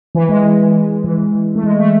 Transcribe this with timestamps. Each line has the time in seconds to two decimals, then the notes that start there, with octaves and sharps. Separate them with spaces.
0.15 E3
0.29 G#3
1.04 E3
1.55 A3
1.64 G#3
1.80 A3